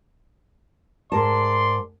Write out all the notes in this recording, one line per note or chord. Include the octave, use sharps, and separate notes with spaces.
G#2 A#4 D5 A5 C6